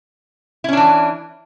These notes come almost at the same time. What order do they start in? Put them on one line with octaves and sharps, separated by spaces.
E4 C#4 D4 E3